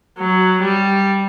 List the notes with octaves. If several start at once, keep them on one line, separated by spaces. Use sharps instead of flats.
F#3
G3